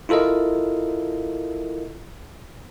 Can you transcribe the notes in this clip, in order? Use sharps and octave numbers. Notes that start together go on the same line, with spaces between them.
E4 F4 A4 A#4 D#5